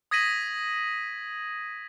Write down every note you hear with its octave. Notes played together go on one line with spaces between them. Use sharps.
D#6 G#6 A#6 B6 D#7 F#7